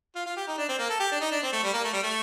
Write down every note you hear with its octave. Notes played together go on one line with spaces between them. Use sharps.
F4
F4
G4
D#4
D4
C4
A#3
A4
G4
D4
D#4
D4
C4
A3
G3
A#3
A3
G3
A3